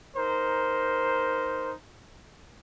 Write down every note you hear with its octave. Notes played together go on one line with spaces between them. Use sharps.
D#4 A#4 C5